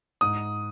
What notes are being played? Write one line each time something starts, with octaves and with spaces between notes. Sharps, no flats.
G#2 D#6